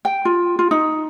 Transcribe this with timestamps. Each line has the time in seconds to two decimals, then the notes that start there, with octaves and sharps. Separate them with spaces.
0.05 G5
0.25 F4
0.59 F4
0.71 D#4